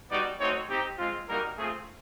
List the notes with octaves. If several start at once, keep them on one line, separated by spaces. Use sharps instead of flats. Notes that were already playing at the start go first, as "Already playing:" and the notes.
G3 B3 D#4 F#4 D5
A3 C4 D#4 F#4 C#5
C4 D#4 G4
G#3 C4 F4
G3 A#3 D#4 F#4 A#4
A3 C4 F4 G#4